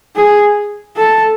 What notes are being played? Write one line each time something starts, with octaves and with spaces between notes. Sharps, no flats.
G#4
A4